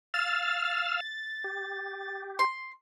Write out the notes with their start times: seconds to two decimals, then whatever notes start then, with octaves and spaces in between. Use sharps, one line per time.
0.14 F5 E6 F6 A6
1.44 G4
2.39 C6